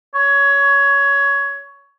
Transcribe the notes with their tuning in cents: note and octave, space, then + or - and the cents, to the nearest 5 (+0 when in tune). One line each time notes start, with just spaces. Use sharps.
C#5 +15